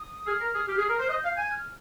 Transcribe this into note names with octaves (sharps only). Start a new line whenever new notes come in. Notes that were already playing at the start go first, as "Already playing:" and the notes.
Already playing: D#6
G#4 F6
A#4
G#4
G4
G#4
A#4
C5
D#5 G6
F5
G#5
F6